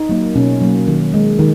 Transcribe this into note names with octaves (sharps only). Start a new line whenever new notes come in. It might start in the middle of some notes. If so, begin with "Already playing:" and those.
Already playing: D#4
F#3 A#3
B2 C#4
F#3 A#3
D#3
G#3
D#3